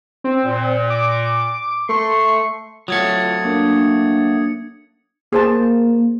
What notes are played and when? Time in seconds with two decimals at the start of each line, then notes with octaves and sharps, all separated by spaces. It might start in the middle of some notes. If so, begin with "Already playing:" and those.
0.24 C4
0.45 A#2
0.90 D6
1.89 A3 C6 C#6
2.88 F#3 A3 F4 D#6 G#6 C#7
3.45 A#3 D4
5.33 A#3 G#4 C5 A5